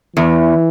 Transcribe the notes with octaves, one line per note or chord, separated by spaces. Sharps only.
E2 E3